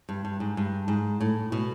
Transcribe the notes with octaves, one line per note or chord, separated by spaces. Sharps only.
G2
G2
G#2
G2
G#2
A2
B2